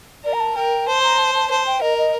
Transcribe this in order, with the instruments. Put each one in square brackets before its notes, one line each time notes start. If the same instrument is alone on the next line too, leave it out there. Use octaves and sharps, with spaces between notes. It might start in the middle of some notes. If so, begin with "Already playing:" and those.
[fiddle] A#4 [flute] D5
[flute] A#5
A5
[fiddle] A#4 [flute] G5
[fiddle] C5 [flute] A5
[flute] A#5
A5
A5
[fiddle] C5 [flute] A5
[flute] G5
[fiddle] A#4 [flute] D#5
[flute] D#5